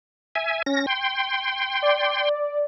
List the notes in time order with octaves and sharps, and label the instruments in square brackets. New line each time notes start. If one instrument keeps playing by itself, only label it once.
[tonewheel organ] E5 G#5
C#4 A#6
G5 C6
[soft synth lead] D5